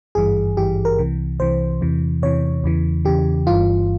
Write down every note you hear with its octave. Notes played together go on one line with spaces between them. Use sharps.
G#1 G2 E3 G#4
G#1 G2 E3 G4
A#4
C2 C3 E3
C2 C3 E3 C5
E2 C3 E3
E2 C3 E3 C#5
E2 C#3 E3
E2 C#3 E3 G4
G1 G2 E3 F4